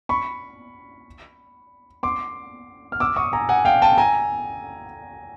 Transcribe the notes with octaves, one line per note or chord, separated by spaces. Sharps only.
B5 C#6
C6 D6
F6
D6 E6
C#6 D#6
G#5 A#5
F#5 G#5
F5 G5
G5 A5
G#5 A#5